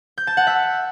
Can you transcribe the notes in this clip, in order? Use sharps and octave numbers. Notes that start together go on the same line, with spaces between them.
G6
A5
F#5
E5